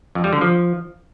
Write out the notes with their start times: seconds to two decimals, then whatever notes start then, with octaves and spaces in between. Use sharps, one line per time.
0.15 F2
0.24 G3
0.33 D3
0.41 F3